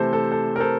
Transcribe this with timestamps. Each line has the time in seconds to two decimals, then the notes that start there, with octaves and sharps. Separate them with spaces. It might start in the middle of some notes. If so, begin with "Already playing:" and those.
Already playing: C3 E3 A3 A4 C5
0.13 A4
0.32 A4
0.56 A#4
0.60 A4 C5